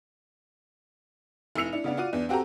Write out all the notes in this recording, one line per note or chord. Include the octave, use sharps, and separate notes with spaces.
F1 E4 E6 C#7 F7
D4 E4
C#3 B3 D4
F4 F#4 D5 D#7
E2 D4
C4 F#4 G4 A4 A#5